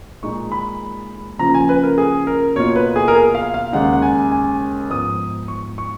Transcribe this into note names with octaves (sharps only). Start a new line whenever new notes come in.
A#2 G#3 D#4 C#6
B5
C#3 F3 A#3 F4 A#5
G#5
B4
A#4
G#4
A#4
B2 A#3 F4 C#5
B4
G#4
A#4
G#4
F5
F5
D#2 C#3 G#3 D#4 F#5
F#5
G#5
G#5
G#2 F3 B3 D#4 D#6
C#6
C#6